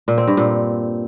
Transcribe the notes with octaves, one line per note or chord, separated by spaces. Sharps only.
A#2
C4
G2
A#2